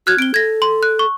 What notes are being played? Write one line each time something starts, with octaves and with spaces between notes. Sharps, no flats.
F#4 F6 F#6 G#6
C4 D7 G7
A4 G#6 A#6
C6
F#6
C#6